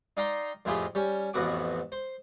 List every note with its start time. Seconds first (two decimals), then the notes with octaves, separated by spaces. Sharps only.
0.17 D#4 D5 F5 G5 A#5 C6
0.65 F2 A2 E4 F4 G4 G#4
0.95 G3 C#4
1.33 A1 F2 A2 B3 F#4 D6
1.92 C5